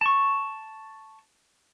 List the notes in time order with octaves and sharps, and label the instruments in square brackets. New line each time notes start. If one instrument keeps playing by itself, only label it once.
[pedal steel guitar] A5 C#6